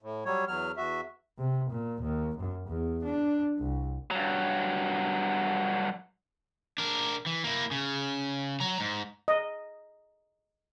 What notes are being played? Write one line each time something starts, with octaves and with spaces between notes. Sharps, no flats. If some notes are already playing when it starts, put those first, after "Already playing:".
A2
F#3 G3 C#5
E2 F#3 F6
E2 F#4 E5
C3
A#2
D#2
F#2
E2
D4
C2
G2 F#3
D4 A#4
E3
A#3 E4
C#3
F#3 A#5
G#2
D#5